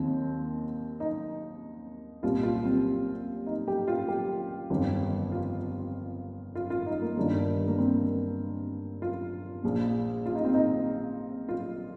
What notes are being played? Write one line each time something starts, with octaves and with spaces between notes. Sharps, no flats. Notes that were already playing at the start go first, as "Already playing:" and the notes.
Already playing: D#2 D#3 C4
D#4
C2 A#2 F4
F4
C4
D#4
G4
F4
G4
G1 F2 D#3
F4
F4
F4
D#4
A#3
G1 G2 D#3
A#3
C4
F4
A#1 A#2
F4
D#4
C4
D#4
F4